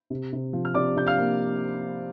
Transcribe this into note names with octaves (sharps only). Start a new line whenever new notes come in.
C3
C3
F3
F6
C3 D5 D6
C3 G6
F5 F6
A#3